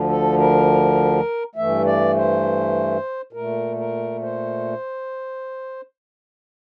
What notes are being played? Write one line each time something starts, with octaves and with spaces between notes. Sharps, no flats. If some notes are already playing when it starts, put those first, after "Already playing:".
Already playing: D2 D3 F3
A4
A#4
G2 E3 A3 E5
D5
C5
A#2 A3 A#4
A#4
C5